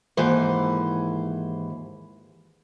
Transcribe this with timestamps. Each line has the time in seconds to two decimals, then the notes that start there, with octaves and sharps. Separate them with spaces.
0.17 D#2 G#2 E3 C5